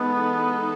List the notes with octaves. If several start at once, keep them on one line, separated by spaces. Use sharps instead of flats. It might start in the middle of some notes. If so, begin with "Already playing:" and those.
Already playing: E3 G#3 B3 D#4 A4